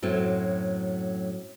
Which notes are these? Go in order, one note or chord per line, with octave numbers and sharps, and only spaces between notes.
F#2 A2 F#3 C4